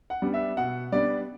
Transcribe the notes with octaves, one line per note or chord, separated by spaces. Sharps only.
F#5
G3 B3 D4
E5
B2 F#5
G3 B3 D4 D5